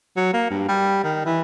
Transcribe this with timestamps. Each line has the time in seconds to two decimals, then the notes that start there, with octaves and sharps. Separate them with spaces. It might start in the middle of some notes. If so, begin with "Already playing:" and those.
0.17 F#3
0.34 A#3
0.51 G2
0.68 G3
1.04 D#3
1.26 E3